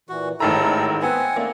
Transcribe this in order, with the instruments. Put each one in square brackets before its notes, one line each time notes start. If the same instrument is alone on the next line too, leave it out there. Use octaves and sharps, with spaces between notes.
[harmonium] A#2 E3 [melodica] F#4
[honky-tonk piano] A1 D#3 A#5 [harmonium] G#2 E4 [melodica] A4
[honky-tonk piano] B3 [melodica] C4 F#5 G#5
[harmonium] A3 C#4 D5 [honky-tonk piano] A#3